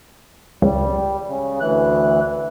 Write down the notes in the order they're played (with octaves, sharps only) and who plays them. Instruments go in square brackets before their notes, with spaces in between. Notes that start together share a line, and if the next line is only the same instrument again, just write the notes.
[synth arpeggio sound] C#2 [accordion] G3
[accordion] C#3
D2 E3 F#6